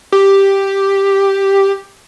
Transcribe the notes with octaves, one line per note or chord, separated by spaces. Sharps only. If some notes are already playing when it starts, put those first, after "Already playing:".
G4